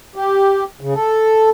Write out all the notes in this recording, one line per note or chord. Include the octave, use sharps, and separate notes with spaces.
G4
C#3
A4